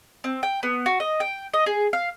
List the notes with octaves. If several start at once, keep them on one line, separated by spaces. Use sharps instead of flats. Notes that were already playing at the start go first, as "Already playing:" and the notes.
C4
G5
B3
F#4
D#5
G5
D#5
G#4
F5